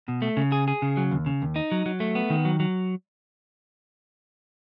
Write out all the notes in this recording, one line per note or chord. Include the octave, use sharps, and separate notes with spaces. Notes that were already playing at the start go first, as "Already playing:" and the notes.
B2
A3
C#3
G#4
G#4
C#3
F#3
D#2
C#3
D#2
D#4
F#3
F#3
A3
B3
D#3
F#3
F#3